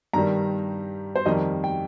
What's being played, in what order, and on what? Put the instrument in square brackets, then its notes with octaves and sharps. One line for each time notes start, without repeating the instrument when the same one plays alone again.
[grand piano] G2 D#3 G3 A#5
C5
F2 D#3 G3 D#5
G5